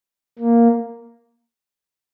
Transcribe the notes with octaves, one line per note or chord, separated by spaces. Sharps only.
A#3